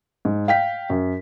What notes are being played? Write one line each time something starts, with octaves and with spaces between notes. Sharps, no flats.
G#2
F5 G5 B6
F#2